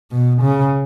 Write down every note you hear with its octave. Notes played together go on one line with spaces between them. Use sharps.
B2
C#3